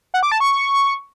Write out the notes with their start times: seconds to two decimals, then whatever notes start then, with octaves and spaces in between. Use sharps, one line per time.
0.14 F#5
0.23 D6
0.32 A5
0.40 C#6